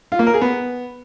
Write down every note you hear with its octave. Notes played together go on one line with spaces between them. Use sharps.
F4
A#3
A#4
G#4
B3